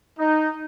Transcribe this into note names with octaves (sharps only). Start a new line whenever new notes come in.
D#4